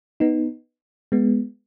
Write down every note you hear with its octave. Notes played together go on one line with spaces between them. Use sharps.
B3 D#4
G#3 B3